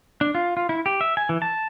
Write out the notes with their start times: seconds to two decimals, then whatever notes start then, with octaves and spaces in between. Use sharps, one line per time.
0.21 D4
0.35 F4
0.57 F4
0.69 E4
0.86 G4
1.01 E5
1.17 G#5
1.29 E3
1.42 A5